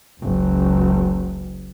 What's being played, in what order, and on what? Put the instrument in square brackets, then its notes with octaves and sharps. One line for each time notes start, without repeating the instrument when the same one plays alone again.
[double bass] F#1 C#2